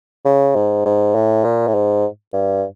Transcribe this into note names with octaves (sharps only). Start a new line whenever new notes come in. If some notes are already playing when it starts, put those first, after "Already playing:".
C#3
G#2
G#2
A2
A#2
A2
G#2
G2